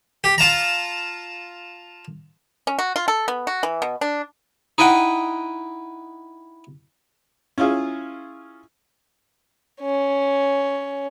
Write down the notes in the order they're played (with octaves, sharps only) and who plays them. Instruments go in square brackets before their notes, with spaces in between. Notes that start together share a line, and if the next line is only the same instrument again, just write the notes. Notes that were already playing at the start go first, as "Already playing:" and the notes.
[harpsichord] G4
F4 A5 A#5
[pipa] C#4
F#4
F4
A4
B3
F#4
E3
B2
D4
[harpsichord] D#4 E4 D#5 F#5 G5
[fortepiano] C#4 E4 F4 G#4
[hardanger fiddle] C#4